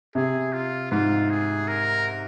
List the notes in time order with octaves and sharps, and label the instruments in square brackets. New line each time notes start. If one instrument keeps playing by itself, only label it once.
[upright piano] C3 [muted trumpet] G#4
[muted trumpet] F4
[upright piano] G#2 [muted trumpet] F4
[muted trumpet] G#4
A#4